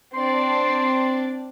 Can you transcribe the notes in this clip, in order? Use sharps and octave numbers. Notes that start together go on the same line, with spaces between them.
C4 D4 D5 C6